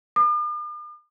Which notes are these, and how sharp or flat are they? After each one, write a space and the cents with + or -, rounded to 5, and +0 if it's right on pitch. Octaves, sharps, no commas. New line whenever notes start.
D6 +45